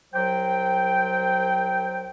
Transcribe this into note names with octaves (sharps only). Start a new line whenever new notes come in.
C2 F#3 C5 G5